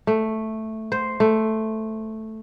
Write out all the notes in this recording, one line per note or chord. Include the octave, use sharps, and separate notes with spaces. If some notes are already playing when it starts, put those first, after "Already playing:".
A3
C5
A3